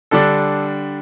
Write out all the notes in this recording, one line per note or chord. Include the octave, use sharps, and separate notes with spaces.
D3 G3 D4 A4